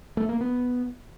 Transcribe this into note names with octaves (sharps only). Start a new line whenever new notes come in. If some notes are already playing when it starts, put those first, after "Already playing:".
A3
A#3
B3